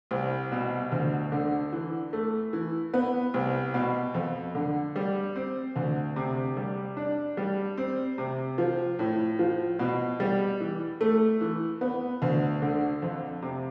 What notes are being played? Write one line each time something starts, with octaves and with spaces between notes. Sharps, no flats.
C2
B2
D2
D3
E3
A3
E3
B3
C2
B2
F2
D3
G3
C4
D2
C3
G3
D4
G3
C4
C3
F3
A2
F3
B2
G3
E3
A3
E3
B3
D2
D3
F2
C3